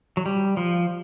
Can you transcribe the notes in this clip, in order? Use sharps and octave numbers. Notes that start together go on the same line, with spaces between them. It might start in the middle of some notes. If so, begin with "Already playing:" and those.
F#3
G3
F3